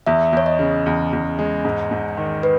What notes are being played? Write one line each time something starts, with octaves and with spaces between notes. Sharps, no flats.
E2 E5
E2 C#5
D#5
C#3
E2
E2
G#3
G#2
G#2
D#3
B4